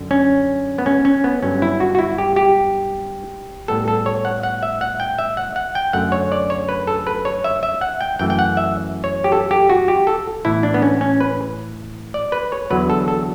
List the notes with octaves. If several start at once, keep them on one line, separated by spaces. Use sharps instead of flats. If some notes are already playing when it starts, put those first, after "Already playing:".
Already playing: F#2 D3
C#4
B3
C#4
C#4
B3
G2 D3 F#3 B3 C#4
E4
F#4
F#4
E4
G4
G4
A2 G3 B3 A4
A4
C#5
F#5
F#5
E5
F#5
G5
E5
F#5
F#5
G5
F#2 D3 A3 F#5
C#5
D5
C#5
B4
A4
B4
C#5
E5
E5
F#5
G5
F#2 E3 A3 G5
G5
F#5
E5
C#5
G4
A4
G4
F#4
G4
A4
A2 E3 B3 E4
D4
B3
C#4
C#4
B4
D5
B4
C#5
E2 D3 F#3 B3 B4
A4
A4